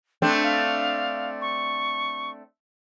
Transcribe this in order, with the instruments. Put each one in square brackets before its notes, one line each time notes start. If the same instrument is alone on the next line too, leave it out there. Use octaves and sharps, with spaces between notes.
[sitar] A3 C4 D4 [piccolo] G6
[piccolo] F5
C#6